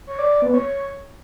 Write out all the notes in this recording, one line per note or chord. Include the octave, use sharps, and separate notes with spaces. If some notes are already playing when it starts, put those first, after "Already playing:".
C#5
D5
D5
B3
C#5